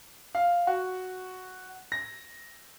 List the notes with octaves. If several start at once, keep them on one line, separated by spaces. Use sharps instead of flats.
F5
F#4
A#6